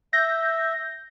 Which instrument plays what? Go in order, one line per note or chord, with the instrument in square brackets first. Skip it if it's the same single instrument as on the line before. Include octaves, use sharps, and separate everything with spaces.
[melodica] E5 [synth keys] G6 A#6